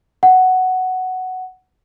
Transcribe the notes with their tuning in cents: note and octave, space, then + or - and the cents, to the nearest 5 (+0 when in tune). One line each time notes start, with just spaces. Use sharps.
F#5 +5